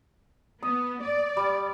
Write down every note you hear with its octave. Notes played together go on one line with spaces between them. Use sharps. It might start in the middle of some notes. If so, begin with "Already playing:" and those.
B3 D#6
D5
G3